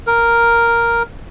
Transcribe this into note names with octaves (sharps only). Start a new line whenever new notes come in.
A#4